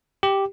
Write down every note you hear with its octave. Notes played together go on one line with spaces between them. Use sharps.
G4